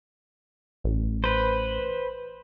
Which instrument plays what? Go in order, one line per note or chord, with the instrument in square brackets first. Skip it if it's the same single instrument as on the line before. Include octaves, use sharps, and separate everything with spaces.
[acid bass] A1
[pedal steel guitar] B4 C5